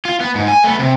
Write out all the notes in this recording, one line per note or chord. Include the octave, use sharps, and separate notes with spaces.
F4
B3
G#2
G#5
A3 B3
C3